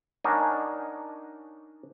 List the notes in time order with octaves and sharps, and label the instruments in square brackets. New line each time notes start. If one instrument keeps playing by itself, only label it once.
[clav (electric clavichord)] D4 D#4 A#4 C#5 F#5 G#5